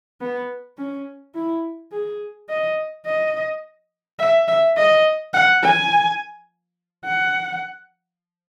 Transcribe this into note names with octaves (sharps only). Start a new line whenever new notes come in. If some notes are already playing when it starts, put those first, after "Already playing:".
B3
C#4
E4
G#4
D#5
D#5
E5
E5
D#5
F#5
G#5
F#5